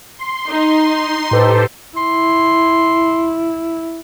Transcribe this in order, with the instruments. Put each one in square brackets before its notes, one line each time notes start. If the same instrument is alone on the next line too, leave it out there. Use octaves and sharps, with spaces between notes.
[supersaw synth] C6
[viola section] D#4
[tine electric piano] A2 B4 C6 [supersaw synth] G4 A4 C5
[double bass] E4 [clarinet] C6